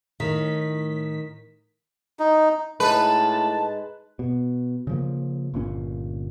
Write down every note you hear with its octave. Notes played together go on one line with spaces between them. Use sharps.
A2 D#3 B6
D#4
A2 G#3 D#4 B4 A5
B2
C#3 F3 A#3
G1 A#2 C#4